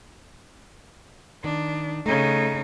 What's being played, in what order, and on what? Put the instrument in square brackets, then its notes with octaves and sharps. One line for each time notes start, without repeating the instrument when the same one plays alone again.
[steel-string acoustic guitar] D#3 [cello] D4
[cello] C#3 D#4 [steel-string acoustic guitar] A3